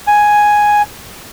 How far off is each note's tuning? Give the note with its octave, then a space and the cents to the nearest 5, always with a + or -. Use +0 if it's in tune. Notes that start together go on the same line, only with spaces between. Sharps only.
G#5 +0